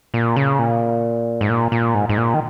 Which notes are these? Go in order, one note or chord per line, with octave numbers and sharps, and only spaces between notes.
A#2
C#3
A#2
G#2
A#2
A#2
G#2
G#2
A#2
D#3